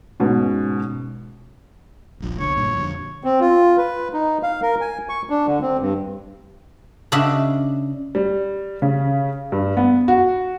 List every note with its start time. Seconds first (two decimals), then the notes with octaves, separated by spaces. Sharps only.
0.20 G#2 B2 C#4
2.20 D#1 A#1
2.40 B1 D3 C#5
2.57 G2 A#2
2.74 F2 D3
3.24 C4
3.40 F4
3.77 B4
4.14 D#4
4.43 F5
4.62 A#4
4.81 G#5
5.09 C#6
5.30 D4
5.47 D3
5.62 C4
5.80 G2
7.12 C#3 D4 F#4 D#5 E5
8.15 G3
8.82 C#3
9.52 G2
9.77 B3
10.08 F#4